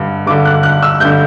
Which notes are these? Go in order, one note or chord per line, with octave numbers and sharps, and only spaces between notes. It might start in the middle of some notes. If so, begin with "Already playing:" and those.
Already playing: G2 D3
G2 D3 D6
F#6
F#6
E6
G2 D3 G6